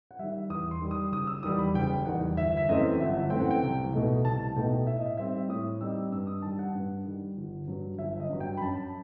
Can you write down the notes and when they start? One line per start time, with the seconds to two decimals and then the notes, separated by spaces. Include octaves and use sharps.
0.11 F#5
0.19 D#3 G3 E5
0.50 E2 D#6
0.71 C6
0.80 D#3 G3
0.91 D#6
1.12 F#1 D#6
1.27 E6
1.43 E2 D#3 G3 D#6
1.59 B5
1.74 F#1 G5
2.06 E2 D#3 G3 F#5
2.37 G1 E5
2.57 E5
2.69 F#2 E3 A3 C4 D#5
3.00 G1 E5
3.30 F#2 E3 A3 C4 G5
3.40 F#5
3.51 G5
3.63 C2
3.93 B2 A3 D#4
4.25 C2 A5
4.56 B2 A3 D#4 G5
4.86 A2 E5
4.96 D#5
5.06 E5
5.17 G3 C4 D#4 E5
5.49 A2 D#6
5.81 G3 C4 D#4 E6
6.12 G2 E6
6.27 D#6
6.42 D#3 G3 A5
6.59 F#5
6.75 G2
7.06 D#3 G3
7.37 G1
7.68 G2 F#3
7.98 G1 E5
8.20 D#5
8.30 G2 F#3
8.40 G5
8.57 B5
8.61 F#2 A5